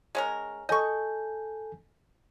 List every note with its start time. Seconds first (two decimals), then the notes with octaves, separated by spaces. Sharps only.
0.15 G#3 C#4 A#4
0.69 A4 D#5 G#5 C#6 G6